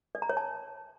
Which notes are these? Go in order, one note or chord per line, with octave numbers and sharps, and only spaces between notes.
D5
A#5
C#5
A5